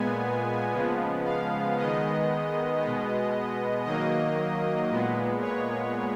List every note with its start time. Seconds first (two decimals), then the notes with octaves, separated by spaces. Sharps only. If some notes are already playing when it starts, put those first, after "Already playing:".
Already playing: A#2 G#3 B3 G#5
0.72 C#3 F3 G#3 B3
1.24 F5
1.77 D#3 G#3 B3 D#5
2.81 B2 G#3 B3
3.85 D#3 F#3 A#3 D#5
4.90 A#2 G#3 B3
5.41 C#5